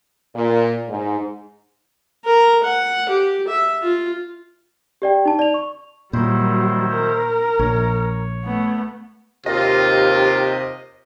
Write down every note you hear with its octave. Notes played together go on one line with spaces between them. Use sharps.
A#2
G#2
A#4
F#5
G4
E5
F4
G4 D5 G5
D#4 A5
D5 F7
C#6
A#2 D#3 F#3 G3 E4 C5
A#4
A#1 C#5
A3 B3
D#2 C3 F4 D#5